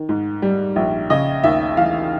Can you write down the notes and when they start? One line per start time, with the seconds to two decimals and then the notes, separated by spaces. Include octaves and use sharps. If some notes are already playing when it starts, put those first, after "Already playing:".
Already playing: D#3
0.09 G#2
0.42 G3
0.76 A#1
1.10 C#3 D#5
1.43 D#2 E5
1.77 E3 F5